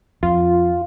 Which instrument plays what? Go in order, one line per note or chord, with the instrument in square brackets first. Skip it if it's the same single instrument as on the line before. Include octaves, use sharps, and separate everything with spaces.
[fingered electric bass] F2 [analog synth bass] F4